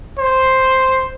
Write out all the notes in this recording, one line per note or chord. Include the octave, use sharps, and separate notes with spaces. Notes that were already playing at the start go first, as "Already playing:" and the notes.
C5